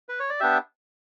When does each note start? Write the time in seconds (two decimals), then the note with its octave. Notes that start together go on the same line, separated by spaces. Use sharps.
0.09 B4
0.20 C#5
0.30 D5
0.40 B3 D4 G4 E5